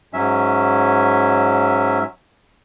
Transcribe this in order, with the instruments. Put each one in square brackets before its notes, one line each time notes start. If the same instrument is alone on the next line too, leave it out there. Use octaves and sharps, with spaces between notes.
[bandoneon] G#2 F#3 C#4 E5